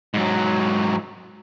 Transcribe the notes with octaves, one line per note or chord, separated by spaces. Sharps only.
G#2 F#3